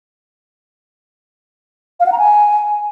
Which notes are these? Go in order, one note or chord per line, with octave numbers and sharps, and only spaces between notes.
F5
F#5
A#5
G#5